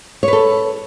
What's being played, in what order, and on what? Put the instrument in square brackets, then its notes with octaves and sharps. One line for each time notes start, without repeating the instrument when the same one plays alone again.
[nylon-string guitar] C#5
B4
A4